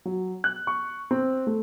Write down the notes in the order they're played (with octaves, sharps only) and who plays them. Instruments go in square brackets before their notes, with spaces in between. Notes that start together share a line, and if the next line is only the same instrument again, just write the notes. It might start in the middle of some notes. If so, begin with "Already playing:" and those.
[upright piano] F#3
F#6
C#6
C4
A3